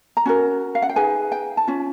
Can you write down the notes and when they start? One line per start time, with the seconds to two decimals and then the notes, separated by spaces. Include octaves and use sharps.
0.17 A#5
0.26 C#4 F#4 A#4
0.75 F5
0.82 F#5
0.89 G5
0.96 D#4 G#4 B4 G#5
1.32 G5
1.57 A5
1.68 C#4 F4